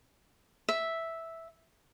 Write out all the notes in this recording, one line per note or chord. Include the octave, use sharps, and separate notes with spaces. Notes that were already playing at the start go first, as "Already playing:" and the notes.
E5